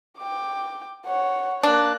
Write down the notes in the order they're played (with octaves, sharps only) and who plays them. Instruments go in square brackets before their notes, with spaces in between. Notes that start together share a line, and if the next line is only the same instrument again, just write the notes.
[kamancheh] G5 D6
C#5 F#5
[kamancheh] A#3 F#6 [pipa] D4